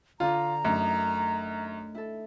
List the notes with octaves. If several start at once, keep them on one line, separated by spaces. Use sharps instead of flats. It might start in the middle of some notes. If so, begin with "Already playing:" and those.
D3 D4 F4 A#5
F#2 A3 D4 D#4
E4 A4